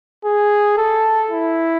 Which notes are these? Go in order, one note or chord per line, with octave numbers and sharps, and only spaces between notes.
G#4
A4
E4